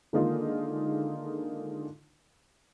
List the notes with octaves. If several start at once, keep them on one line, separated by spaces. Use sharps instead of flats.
D3 D#3 G#3 A#3 D#4 F4